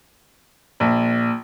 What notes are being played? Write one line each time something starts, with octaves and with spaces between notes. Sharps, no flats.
A#1